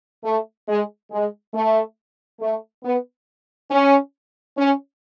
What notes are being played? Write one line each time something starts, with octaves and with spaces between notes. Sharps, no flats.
A3
G#3
G#3
A3
A3
B3
C#4
C#4